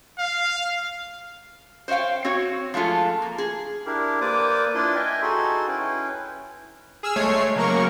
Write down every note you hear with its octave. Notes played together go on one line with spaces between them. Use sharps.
F5
C5 C#5 D#5 F5 G5
C4 F#4 C#5
F3 G#3 A3 F4 A4
A#3
G#4
D4 E4 G4 A#4
A#3 B4 C5 D5 D6 D#6
D4 E4 F4 B4 D5 C6
D#5 E5 G5 G#5
D#4 F#4 G#4 A4 C6
C#4 E4 B4 G5
G#4 E6 F6
G1 G#3 A3 C#5 G#6 C7
C#3 F#3 A#3 A#4 C#6